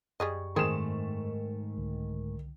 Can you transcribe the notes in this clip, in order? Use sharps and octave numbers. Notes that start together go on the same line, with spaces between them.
F#2 G3 G#4 D#5 C#6
G#2 D#3 A3 C4 D#4 G#4 E7
C2 D3